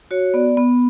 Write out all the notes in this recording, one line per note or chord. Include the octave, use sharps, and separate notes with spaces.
F#4 C#5
B3 D5
B3